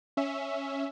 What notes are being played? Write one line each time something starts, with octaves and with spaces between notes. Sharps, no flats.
C#4 E5